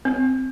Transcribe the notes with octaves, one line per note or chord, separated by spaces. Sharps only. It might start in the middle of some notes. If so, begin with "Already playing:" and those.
C4